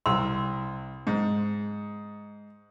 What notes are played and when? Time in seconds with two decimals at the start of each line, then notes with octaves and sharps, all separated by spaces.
0.06 C2 C6 E6
1.07 G#2